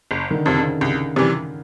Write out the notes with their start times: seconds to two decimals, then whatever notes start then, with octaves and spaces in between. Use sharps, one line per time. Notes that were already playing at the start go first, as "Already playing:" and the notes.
0.11 F#1
0.31 D#3
0.34 D3
0.46 F2 C3
0.58 C#3
0.81 C2 C#3
1.16 C3 E3 G3